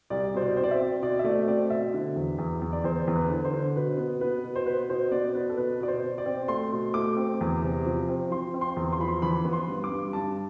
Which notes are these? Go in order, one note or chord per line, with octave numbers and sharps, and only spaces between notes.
C2 D5
B2 C5
D5
C4 C5
D5
E5
C4
B2 D5
E5
A3 D5
C4 D5
B2 E5
D3
E2
E2
E2
D5
E2 C5
E2
B4
D3
C5
D3
B2 B4
B3
B3 B4
B2
C5
B3 B4
B2 C5
B3 D5
B3 B4
A4
B2 B4
B2 D5
C5
B2
D5
C4
A3 C6
B2
A3 D6
C4
E2
C3
F3
C4
F3 C6
C4
C6
E2
C6
F3 B5
C6
E3 B5
B3
C6
G2
D6
G2
G2 A5